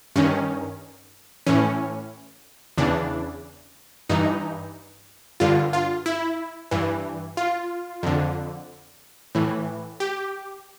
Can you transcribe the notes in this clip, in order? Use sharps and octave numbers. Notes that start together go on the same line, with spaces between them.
G2 D#3 C#4
A2 E3 C#4
E2 C#3 E3 D4
G2 E3 D#4
G2 D3 F4
F4
E4
G2 E3
F4
F2 D3
A2 E3
G4